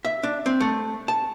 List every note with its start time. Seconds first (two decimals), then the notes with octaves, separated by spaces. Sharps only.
0.05 E5
0.23 D4
0.46 C4
0.60 A3
1.08 A5